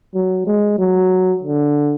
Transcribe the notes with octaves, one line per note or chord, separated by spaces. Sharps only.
F#3
G#3
F#3
D3